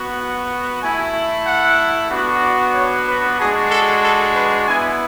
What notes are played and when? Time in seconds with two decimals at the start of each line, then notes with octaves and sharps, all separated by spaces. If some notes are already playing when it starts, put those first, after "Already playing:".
Already playing: B3 F#4
0.19 F#5
0.82 A3 E4 G#5
1.46 F#5
2.10 B3 D4 F#4
2.42 D5
2.75 C#5
3.07 B4
3.39 G#3 D4 F#4 G#4
3.70 A4
4.03 A4
4.35 B4
4.67 B3 E4 G#5